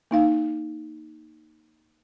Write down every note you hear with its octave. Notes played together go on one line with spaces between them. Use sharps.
A#3 D#4 F5